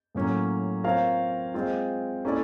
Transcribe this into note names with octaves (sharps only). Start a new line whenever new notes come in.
A2 F#3 A#3 C#4
C4 F4 A#4 C#5 F5
G#3 C4 F4
A#3 C#4 E4 A4 D5